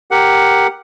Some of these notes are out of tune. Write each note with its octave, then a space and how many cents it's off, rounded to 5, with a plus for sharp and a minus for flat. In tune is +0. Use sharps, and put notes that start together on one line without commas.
G4 +0 A#4 +0 F#5 +5